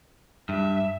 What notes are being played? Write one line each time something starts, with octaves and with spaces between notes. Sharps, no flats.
G2 E5